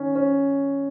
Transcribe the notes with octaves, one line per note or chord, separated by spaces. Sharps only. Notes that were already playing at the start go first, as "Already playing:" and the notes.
Already playing: D#3 C#4
C#4